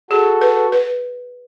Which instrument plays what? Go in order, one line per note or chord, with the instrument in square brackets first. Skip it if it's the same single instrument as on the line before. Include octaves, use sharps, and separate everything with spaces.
[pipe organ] F#4 A4 [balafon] G#4
[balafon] B4
B4